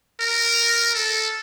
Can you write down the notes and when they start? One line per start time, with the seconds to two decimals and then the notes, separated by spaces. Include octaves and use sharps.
0.20 A#4
0.95 A4